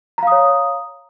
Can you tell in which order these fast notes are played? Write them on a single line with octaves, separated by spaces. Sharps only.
A#5 F5 D#6 C#5